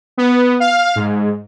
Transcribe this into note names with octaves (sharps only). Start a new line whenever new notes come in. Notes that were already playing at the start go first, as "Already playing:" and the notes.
B3
F5
G#2